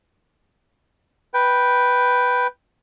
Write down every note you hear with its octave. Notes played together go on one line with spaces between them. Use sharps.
B4 G5